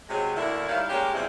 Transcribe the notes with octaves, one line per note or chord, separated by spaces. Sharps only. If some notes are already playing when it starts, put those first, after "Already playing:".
C3 F#3 G#3
D2 D3 A#3 E4
D#3 F#3 G3 E4 F5
G#3 A#3 C#4 G4
E2 B2 F3 G3 C4 E4